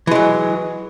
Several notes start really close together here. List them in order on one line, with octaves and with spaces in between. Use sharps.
E3 G#3 F#3